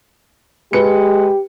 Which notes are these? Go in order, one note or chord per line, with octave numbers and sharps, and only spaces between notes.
G#3 G4 B4 C#7